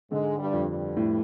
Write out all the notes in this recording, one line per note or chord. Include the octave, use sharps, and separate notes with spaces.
G#2 D3 G#3
G2 G3
F2
G2 G3
A2